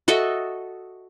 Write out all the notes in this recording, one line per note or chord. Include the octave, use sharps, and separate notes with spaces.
F#4 A4 D#5 E5